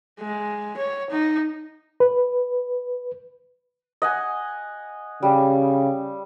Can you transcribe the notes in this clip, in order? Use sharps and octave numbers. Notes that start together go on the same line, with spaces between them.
G#3
C#5
D#4
B4
D#5 F#5 G#5
C#3 G3